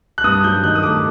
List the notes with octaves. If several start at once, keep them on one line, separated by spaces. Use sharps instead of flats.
F#6
G2 D#6
F#3 G6
D#3 F#6
D#6
A3 D6